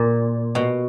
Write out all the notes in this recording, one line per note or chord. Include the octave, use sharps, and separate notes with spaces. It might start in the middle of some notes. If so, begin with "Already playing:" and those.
Already playing: A#2
B2